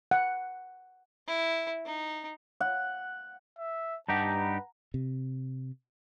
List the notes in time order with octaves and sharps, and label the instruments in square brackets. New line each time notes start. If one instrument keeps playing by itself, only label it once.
[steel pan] F#5
[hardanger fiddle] E4
D#4
[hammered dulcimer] F#5
[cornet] E5
[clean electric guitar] G2 D#4 G4 [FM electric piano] F#5 A#5 [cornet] A5
[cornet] B4
[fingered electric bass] C3